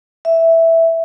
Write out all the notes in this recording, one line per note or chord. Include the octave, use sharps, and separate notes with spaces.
E5